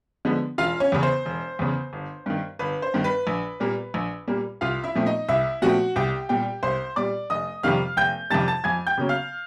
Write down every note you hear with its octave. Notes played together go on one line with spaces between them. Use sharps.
D3 F3 G#3 B3
E1 F4 F5
C#4 C#5
E2 C#3
C5
E1
E2 C#3
G1
G2 D#3
G1 B4
C5
G2 D#3
B4
A#1
A#2 G3 A#3
A#1
A#2 G3 A#3
C2 F4 F5
E4 E5
A#2 F3 A3 C4
D#4 D#5
C2 E4 E5
A#2 F3 A3 C4 F#4 F#5
C2 G4 G5
A#2 G3 G4 G5
C2 C5 C6
A#2 G3 D5 D6
F1 D#5 D#6
F2 C3 D#3 G3 F5 F6
F1 G5 G6
F2 C3 D#3 G3 A5 A6
A5 A6
F2 G#5 G#6
G5 G6
C#3 F#3 A#3 C#4
F5 F6